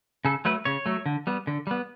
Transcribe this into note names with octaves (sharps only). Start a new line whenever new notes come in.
C#3 A4
F#3 A3 B4
C#3 C#5
F#3 A3
D3
G3 B3
D3
G3 B3